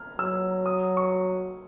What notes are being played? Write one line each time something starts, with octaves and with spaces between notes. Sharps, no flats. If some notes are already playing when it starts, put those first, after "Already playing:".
Already playing: F6
F#3 E6
D#6
C#6